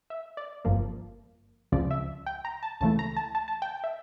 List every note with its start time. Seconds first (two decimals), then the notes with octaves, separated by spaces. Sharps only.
0.10 E5
0.37 D5
0.65 G1 G2 F3 A#3
1.72 C#2 C#3 F3 D5
1.91 E5
2.26 G5
2.45 A#5
2.63 A5
2.81 C#2 C#3 E3 A3 A5
2.99 A#5
3.16 A5
3.35 A5
3.48 A5
3.62 G5
3.84 E5